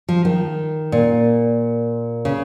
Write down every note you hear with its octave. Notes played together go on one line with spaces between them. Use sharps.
F3
D#3
A#2
C#3